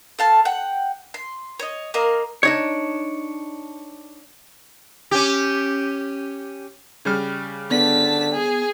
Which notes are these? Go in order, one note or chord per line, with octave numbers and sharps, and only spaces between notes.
A4 F5 A5
F#5 G5
C6
C#5 D#5
A#3 A#4 D#5 F5
D4 D#4 C#5
C#4 G4
C#3 G3 F6
D3 B3 A5 B6
G#4